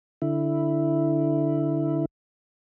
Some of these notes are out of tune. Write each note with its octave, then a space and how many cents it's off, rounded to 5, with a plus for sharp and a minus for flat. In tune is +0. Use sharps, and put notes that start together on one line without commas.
D3 +0 E4 +0